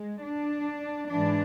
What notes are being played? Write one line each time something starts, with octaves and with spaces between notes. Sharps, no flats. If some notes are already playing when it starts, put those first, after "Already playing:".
Already playing: G#3
D4
G#2 E3 D4